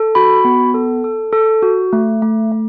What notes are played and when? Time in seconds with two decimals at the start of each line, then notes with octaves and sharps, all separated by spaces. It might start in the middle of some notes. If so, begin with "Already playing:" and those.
Already playing: A4
0.15 F#4 B5
0.45 B3
0.74 A4
1.04 A4
1.33 A4
1.62 F#4
1.93 A3
2.22 A3
2.51 A3